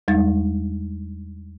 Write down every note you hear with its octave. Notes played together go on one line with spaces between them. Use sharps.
E2 G3 G#3 D#4 A6